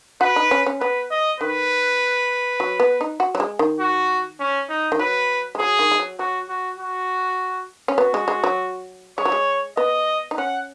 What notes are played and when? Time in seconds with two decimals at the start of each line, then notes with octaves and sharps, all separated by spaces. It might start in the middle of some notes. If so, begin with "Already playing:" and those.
0.21 F#4 B4
0.36 D#4
0.51 C#4
0.66 C#4
0.80 B3 B4
1.11 D#5
1.40 D#3 B4
2.60 F#3
2.80 B3
3.01 D#4
3.20 F#4
3.35 F#3
3.40 G#3
3.59 D#3
3.80 F#4
4.40 C#4
4.69 D#4
4.92 D#3
4.99 F#3 B4
5.55 G#3
5.59 F#3 G#4
5.79 D#3
5.91 G#3
5.99 F#3
6.19 F#3 F#4
6.49 F#4
6.78 F#4
7.88 C#4
7.98 B3 F#4
8.14 G#3
8.28 G#3
8.44 F#3
9.18 G#3 C#5
9.25 F#3
9.32 G#3
9.77 B3 D#5
10.31 D#4
10.37 C#4 F#5